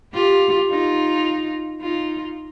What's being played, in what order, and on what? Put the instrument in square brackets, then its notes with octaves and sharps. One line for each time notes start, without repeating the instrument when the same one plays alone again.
[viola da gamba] F4 G4
D#4 F4
D#4 F4